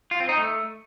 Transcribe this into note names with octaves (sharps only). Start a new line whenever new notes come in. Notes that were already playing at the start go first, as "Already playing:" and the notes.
F4
C4
D#4
A3